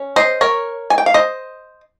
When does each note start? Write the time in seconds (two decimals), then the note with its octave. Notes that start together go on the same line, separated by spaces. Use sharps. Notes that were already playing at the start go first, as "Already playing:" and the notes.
Already playing: C#4
0.16 C5 D#5
0.41 A#4 C#5
0.90 G#5
0.98 G5
1.06 F5
1.14 C5 D#5